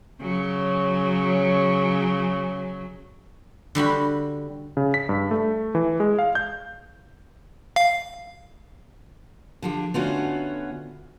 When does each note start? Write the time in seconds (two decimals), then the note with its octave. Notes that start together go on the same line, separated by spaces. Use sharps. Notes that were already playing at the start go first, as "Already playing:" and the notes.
0.21 C#3 F#3
3.75 D3 G3 F#4 B5
4.77 C#3
4.94 B6
5.09 G2
5.31 A3
5.75 E3
6.00 G#3
6.19 F5
6.35 G6
7.76 F5
9.62 D3 F3 G4
9.94 D3 A3 B3 C#4 F4 F#4